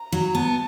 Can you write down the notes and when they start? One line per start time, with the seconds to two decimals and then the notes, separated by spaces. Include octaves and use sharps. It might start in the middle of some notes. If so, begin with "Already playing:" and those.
Already playing: A#5
0.12 F#3
0.35 B3 A5